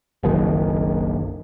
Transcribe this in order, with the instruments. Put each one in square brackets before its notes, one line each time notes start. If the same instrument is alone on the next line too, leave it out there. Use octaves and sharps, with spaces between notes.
[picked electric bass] F#1 B1 D#3